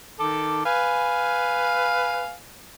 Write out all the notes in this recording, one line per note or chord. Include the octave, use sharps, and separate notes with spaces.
D#3 A4 D6
B4 F5 G#5